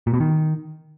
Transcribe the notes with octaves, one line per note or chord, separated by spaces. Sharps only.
A#2
B2
D#3